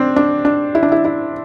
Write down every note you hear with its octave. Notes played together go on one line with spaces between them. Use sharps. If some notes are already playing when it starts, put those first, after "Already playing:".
Already playing: C4 D4
D4
D4
E4
D4
E4
E4